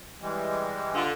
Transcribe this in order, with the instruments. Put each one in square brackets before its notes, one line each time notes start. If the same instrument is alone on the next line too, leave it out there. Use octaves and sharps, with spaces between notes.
[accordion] E3 G3 G#3
[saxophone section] D3 F4